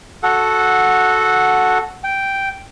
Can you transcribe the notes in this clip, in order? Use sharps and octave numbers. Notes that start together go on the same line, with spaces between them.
F#4 A4 F#5
G5